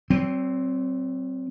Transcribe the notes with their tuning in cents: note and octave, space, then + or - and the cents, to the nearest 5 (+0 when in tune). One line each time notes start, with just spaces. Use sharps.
F#3 +40 C4 +5